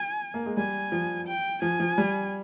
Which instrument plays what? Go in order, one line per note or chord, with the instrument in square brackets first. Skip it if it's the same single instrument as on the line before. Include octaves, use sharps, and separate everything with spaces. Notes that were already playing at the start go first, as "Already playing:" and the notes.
Already playing: [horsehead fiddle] G#5
[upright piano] A#3
G#3
[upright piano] G3 [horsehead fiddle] G#5
[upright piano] F3
[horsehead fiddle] G5
[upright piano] F3 [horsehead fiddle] G#5
[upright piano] F3
G3